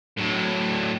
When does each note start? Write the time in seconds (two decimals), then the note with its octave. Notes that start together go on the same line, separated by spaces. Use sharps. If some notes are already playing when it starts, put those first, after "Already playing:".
0.17 A2 F#3